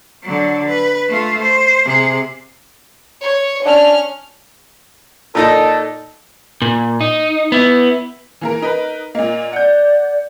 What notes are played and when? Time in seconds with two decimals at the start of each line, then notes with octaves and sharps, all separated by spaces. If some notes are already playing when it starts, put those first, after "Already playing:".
0.23 D3 F#3
0.69 B4
1.08 A3 F4
1.42 C5
1.85 C3 G#4
3.22 C#5
3.66 C#4 D4 F6
5.35 A#2 D#4 A4 D#5
6.62 A#2
7.01 D#4
7.52 B3 E4
8.41 E3 A#3 A#4
8.62 D#4 A#4 B4
9.15 A#2 A#3 D#5
9.53 D5 F#5 G6